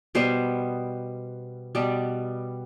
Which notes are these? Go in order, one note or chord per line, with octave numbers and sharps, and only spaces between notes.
B2 G3 B3 C5
B2 G3 B3 D5